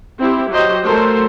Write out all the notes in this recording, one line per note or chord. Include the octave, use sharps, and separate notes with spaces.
C4 E4 G4
F#3 G4 C5 D#5
F#3 A3 A4 A#4 C5